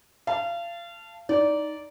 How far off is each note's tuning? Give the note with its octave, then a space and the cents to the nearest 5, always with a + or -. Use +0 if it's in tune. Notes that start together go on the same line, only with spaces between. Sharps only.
F5 -30 A5 +0
D#4 +0 D5 -15